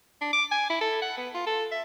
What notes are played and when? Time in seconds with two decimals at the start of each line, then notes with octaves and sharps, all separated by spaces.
0.21 D4
0.33 D6
0.51 G#5
0.70 E4
0.81 A4
1.02 F#5
1.17 B3
1.35 F4
1.47 A4
1.72 E5